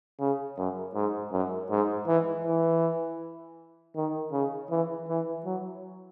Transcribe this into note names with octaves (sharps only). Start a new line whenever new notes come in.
C#3
F#2
G#2
F#2
G#2
E3
E3
D#3
C#3
E3
E3
F#3